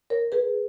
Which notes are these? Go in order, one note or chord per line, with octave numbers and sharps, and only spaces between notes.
A#4 C#5
G#4 B4